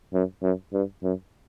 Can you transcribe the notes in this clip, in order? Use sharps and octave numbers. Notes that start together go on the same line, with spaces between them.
F#2
F#2
G2
F#2